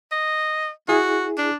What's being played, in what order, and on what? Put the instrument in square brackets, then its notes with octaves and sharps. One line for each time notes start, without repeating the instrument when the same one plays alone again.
[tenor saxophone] D#5
[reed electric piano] E4 G#4 [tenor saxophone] F#4
[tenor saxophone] D4